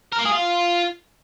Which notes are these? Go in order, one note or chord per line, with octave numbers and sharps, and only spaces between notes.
A#4
A#3
G#4
F4